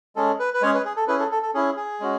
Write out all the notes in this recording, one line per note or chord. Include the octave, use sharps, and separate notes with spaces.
G#3 C#4 G#4 A4
B4
B4
G#3 C#4 G#4 C#5
B4
G#4
A4
C#4 E4 G#4 B4
A4
A4
A4
C#4 E4 G#4
G#4
G#3 C#4 F#4